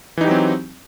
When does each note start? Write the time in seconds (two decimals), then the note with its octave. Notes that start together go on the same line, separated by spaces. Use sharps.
0.17 E3
0.21 D#4
0.24 G4
0.28 F#3
0.31 C4